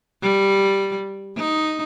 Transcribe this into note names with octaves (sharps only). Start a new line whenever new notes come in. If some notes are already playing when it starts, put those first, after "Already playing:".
G3
D#4